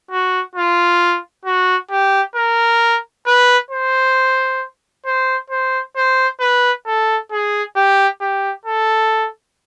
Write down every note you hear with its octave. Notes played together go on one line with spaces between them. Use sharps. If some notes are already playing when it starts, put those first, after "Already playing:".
F#4
F4
F#4
G4
A#4
B4
C5
C5
C5
C5
B4
A4
G#4
G4
G4
A4